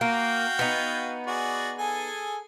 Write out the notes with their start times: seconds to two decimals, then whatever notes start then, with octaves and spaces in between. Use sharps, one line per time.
0.01 A#3 F#4 F5 G5
0.59 B3 D#4
1.27 F#4 G#4 D5
1.78 G#4 A4 G#5